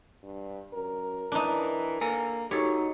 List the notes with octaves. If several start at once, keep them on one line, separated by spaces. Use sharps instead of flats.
G2
F#2 A#4
E3 D4 D#4
A#3 A4 G#5 A#5
D#4 F#4 G4 A4 C#5